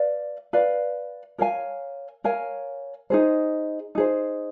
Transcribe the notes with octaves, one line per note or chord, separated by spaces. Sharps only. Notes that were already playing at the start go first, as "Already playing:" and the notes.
Already playing: B4 D5 F5
B4 D5 F5
A#4 C#5 F5 G#5
A#4 C#5 F5 G#5
D#4 G#4 C5
D#4 G#4 C5